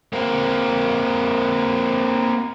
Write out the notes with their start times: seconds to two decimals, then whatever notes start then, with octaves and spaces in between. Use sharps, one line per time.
0.13 A#3 C4